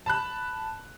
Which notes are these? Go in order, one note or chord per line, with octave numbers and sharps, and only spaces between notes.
A5 B5 F#6